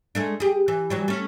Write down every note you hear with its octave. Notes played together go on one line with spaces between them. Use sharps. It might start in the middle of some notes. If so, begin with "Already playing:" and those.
G#3 A3 D4
G4 G#4
E3
E3 F#3 G3
A3 C#4